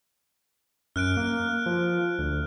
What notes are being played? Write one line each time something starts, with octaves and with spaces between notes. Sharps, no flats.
F#2 F6 F#6 D7
A#3
F3
D2